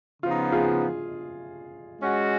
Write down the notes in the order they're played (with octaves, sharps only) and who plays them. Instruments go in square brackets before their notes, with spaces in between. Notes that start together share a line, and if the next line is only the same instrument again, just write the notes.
[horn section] C#3 F3 B3 D#4 [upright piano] F4
[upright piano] F4 G#4
[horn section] G#3 C#4 F#4